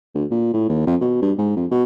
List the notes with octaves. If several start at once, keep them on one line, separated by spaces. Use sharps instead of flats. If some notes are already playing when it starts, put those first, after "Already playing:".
D2
A#2
A2
D#2
F2
B2
G2
G#2
F2
B2